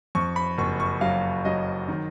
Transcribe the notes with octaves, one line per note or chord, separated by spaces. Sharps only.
F2 C#6
B5
F#1 C#6
C#6
F#3 F5
F#3 D#5
D#3